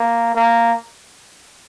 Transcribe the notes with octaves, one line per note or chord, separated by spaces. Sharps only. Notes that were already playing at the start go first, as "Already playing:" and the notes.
Already playing: A#3
A#3